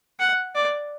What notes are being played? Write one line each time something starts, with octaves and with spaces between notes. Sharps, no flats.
F#5
D5